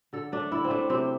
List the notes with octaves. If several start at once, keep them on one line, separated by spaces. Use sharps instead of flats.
D3 A4
A3 D4
D3 E4
C4
A3 D4
C3 C4